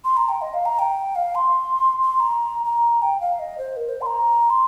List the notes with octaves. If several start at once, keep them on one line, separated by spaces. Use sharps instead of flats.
C6
A#5
G5
D#5
F5
A#5
G5
F5
C6
C6
C6
A#5
A#5
G5
F5
D#5
C5
A#4
C5
C6
A#5
C6